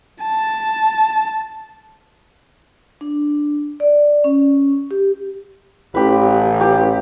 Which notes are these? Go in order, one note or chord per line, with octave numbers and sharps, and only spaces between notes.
A5
D4
D5
C#4
G4
A1 G4 B4
G4